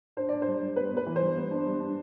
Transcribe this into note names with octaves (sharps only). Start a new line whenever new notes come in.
D4 C5
D4 D5
C5
G2
G2
B3 B4
B3
B4
E3
C5
G2
B3
D4
G2
D4